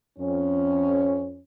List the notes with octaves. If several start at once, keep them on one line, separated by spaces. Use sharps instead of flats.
F2 C#4